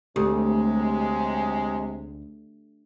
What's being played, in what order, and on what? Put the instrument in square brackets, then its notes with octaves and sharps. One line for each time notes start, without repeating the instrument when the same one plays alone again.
[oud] D2 [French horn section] C3 F#3 G#3 [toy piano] G4 A4